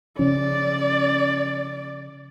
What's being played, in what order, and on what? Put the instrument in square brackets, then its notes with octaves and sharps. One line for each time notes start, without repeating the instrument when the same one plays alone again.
[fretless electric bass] C#3 F3 [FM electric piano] C#4 [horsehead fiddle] D5